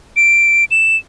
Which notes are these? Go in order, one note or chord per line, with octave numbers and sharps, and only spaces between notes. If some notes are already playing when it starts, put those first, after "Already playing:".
D7
E7